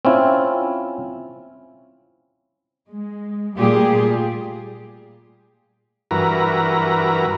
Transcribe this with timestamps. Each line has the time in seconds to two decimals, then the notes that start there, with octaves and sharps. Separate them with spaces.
0.05 C4 C#4 E4 F4
2.89 G#3
3.56 A#2 G3 A3 F4 G4 G#4
6.11 G2 E3 F#4 A#4 B4 A#5